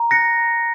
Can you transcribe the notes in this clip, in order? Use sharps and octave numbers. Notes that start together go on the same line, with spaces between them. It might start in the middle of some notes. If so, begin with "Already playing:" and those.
Already playing: A#5
F#6 A#6 C#7
A#5